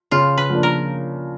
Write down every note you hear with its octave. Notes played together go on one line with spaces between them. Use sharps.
C#3 F4
B4
F3 A#3 D4
A#4